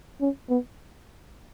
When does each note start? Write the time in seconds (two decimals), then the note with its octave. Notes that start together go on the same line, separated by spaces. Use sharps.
0.21 C#4
0.50 B3